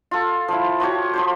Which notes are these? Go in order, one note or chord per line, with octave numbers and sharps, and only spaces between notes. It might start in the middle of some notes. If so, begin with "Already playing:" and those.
F4 A4
F3 E4
F3 F#4 G4 C#5
F3 G4 C5